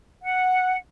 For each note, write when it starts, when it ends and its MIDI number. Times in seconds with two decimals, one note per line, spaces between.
0.22 0.78 78